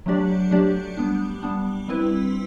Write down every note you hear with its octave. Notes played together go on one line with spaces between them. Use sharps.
F#3 A3 D4 G4 D5
F#3 A3 D4 G4 D5
G3 B3 D4
G3 B3 D4
G3 C4 E4 B4